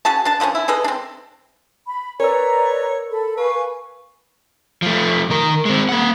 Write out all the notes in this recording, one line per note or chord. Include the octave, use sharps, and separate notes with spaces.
C#4 F#4 G#4 A5
D4 A5
D3 F3 A#3 C#4
E4
G#4 A4 B4 D#5
C4 D4
B5
A#4 B4 C#5 D5 A#5 E6
A4 B5
B4 F5 G#5 C#6
F3 A3
D#3 A#4
G#3 C4
A#3 F#5